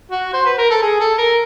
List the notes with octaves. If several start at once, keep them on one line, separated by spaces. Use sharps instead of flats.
F#4
C5
B4
A#4
A4
G#4
A4
A#4